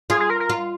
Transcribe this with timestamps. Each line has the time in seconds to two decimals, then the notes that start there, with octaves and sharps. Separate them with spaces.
0.10 F4 G#4
0.20 G#4
0.30 A#4
0.40 A#4
0.50 F4